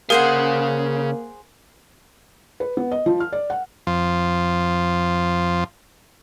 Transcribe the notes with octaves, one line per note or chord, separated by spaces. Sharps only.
C#3 A#3 G#4 A#4 C5 F5 F#5
B4
B3
D#5
F3
F6
D5
F#5
F2 F3 F4